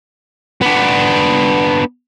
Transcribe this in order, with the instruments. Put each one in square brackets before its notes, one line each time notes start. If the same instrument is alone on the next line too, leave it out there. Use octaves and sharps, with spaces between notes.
[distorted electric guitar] B3 D4